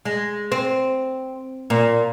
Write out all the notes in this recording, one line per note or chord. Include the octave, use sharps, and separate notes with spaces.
G#3
C4
A#2